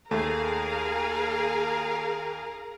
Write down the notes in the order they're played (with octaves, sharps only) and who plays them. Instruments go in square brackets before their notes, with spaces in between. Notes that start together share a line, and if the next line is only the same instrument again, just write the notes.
[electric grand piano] D#2 [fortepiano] A3 [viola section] G#4 F5 [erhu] A#4